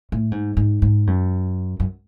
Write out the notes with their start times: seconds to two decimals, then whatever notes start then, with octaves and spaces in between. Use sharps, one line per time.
0.12 A2
0.32 G#2
0.57 G#2
0.82 G#2
1.07 F#2
1.80 F#2